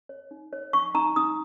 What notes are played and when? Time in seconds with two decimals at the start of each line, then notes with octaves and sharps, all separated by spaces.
0.09 C#5
0.31 D#4
0.53 C#5
0.73 D#4 C#6
0.95 D#4 A#5
1.16 D#4 D#6